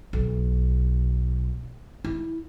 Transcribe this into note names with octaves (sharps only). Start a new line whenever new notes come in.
B1
E4